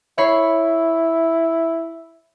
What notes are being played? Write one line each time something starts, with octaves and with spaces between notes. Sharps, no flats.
E4 C#5 B5 C7